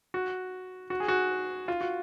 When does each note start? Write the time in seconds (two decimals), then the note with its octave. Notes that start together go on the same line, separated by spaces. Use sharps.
0.14 F#4
0.90 F#4
1.00 G#4
1.08 F#4
1.68 F4
1.81 F#4